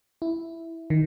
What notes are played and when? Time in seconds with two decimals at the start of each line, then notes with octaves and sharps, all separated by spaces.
0.22 E4
0.90 D#3